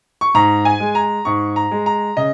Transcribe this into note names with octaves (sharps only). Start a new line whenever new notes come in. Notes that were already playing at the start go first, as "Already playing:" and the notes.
C#6
G#2 A#5
G#5
G#3
A#5
G#2 C#6
A#5
G#3
A#5
C#3 D#5